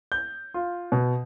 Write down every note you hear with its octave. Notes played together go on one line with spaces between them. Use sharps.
G6
F4
B2